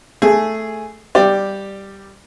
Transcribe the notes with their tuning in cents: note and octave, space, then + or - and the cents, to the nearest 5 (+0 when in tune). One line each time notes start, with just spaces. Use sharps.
A3 +0 G#4 +0
G3 +0 G4 +0 D5 +10